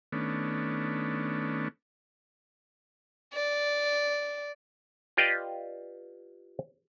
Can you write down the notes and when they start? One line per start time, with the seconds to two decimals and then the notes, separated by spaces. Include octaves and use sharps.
0.12 D#3 A3 B3 C#4 D4
3.34 D5
5.17 F4 G4 B4 D5 D#5 G5